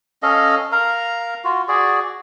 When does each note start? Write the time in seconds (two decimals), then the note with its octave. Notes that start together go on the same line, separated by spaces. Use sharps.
0.23 C#4 A4 D#5 F5
0.72 A#4 F5 A#5
1.44 F4 F#4
1.68 F#4 G#4 D5